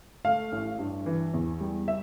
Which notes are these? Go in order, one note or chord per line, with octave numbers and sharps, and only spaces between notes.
A3 F5
A1
G2
E3
E2
G3
E5